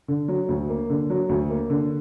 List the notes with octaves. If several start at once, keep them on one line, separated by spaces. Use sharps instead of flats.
D3
F#3
D2
A#3
D3
F#3
D2
A#3
D3